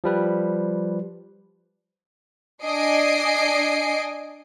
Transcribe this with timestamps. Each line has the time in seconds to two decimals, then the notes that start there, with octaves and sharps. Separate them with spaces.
0.04 F3 G3 B4
2.63 D4 D#5 G#5 C7 D7